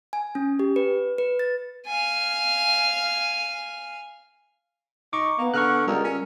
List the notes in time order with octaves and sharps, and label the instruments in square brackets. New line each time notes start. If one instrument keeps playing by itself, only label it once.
[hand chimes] G#5
C#4
G4
B4
B4
A6
[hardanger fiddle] F5 G#5
[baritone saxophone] D#4 [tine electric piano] C#6 D6
[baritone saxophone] A#3 [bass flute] B3
[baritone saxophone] D3 [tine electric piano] C#6 F6 F#6
[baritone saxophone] C#2 [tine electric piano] G3 A#4
[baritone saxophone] C#4